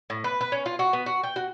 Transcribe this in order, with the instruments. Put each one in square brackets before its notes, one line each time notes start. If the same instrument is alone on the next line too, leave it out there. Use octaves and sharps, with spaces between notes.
[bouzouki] A2
B4
B4
C#4
F4
F#4
B3
F#4
G5
F#4